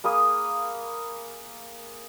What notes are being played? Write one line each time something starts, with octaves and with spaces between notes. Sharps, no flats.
A#3 G#4 B5 D#6